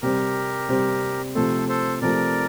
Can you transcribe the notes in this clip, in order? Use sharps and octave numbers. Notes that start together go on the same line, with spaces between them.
C3 G3 C4 G4 A#4
C3 G3 C4
C3 F3 A3 A4 C5
A4 C5
C3 F3 A3 A#4 D5